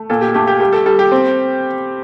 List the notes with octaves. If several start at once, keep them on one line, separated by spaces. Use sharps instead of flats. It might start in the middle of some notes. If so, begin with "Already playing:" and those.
Already playing: A3
A#2 A4
G4
A3 G4
G4
G3 G4
A4
G3 A4
G4
C4